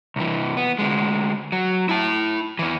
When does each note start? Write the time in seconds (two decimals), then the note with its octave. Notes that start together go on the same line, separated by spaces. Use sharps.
0.16 C2 E3
0.57 B3
0.79 D2 G#3
1.52 F#3
1.89 E4 A5
2.59 E2 E3